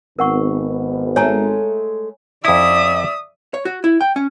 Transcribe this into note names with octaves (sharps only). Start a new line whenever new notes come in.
G#1 B3 A#4 F#5 C#6
G#3 A3 A4 C#5 G#5 A#5
F2 E4 D5 E5 D#6
C#5
F#4
E4
G5
C#4